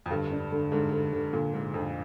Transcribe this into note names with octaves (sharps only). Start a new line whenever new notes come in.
F2
G2 D3
D4
D3
G#2 D3
D3
D3
A#2 D3
G#2 D3
F2 D3